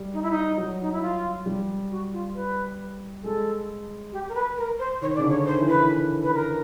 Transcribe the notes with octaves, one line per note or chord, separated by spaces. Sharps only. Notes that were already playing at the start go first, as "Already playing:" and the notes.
Already playing: G3
D#4
E4
D#4
F#3
D#4
E4
F4
G3
F#4
F4
B4
G#3 A4
G4
A#4
B4
A#4
C5
D#3 C#5
C#3 D5
D3
C#5
D#3 C5
E3
D#3 B4
E3
B4
A#4